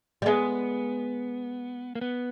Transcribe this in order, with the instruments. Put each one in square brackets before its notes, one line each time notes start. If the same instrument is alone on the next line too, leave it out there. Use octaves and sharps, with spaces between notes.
[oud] G3
[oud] G#3 [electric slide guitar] B3
[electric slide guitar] A#3
B3